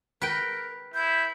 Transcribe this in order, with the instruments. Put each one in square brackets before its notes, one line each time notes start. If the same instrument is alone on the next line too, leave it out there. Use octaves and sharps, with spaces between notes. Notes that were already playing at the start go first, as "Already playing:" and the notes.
[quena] A#4 [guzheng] B4 G5
[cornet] E4 [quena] G6